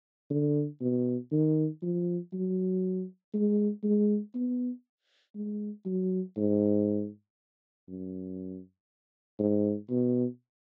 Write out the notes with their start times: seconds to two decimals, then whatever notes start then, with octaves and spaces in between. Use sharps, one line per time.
0.30 D3
0.82 B2
1.32 D#3
1.83 F3
2.33 F#3
3.34 G#3
3.83 G#3
4.35 B3
5.35 G#3
5.85 F#3
6.37 G#2
7.88 F#2
9.39 G#2
9.90 B2